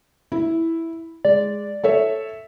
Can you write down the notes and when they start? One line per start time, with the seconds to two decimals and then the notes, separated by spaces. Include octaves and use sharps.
0.32 E4
1.25 G#3 D5
1.84 A4 C#5 E5